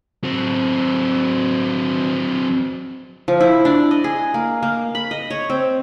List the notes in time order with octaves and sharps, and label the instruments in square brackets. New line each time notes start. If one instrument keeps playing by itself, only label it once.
[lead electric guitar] F#3 C4
[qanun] F3
E4
D4
D#5
G#4
A#3
A#3
B5
D#5
C#5
C4